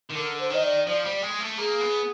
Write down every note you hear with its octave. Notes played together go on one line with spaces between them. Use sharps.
D#3
D3 A#4
C5
D#3 D#5
D5
F3 D5
G3
G#3
A3
A#3 G#4
B3